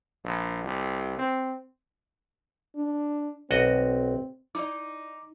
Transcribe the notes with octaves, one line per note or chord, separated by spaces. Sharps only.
A#1
C2
C4
D4
B1 C4 F#4 D#5
D#4 E4 D5 D6